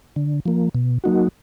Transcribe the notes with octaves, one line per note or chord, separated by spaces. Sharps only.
D3
F3 A#3
B2
F#3 A#3 D#4 F#4